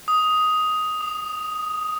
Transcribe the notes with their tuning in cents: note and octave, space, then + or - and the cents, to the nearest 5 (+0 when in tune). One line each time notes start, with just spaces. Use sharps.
D#6 +10
D#6 -30